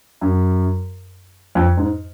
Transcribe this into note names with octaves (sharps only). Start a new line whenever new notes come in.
F#2
F2
G#2